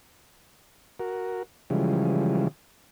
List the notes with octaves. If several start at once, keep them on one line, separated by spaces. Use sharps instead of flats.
F#4 A#4
C#3 E3 F3 G3 G#3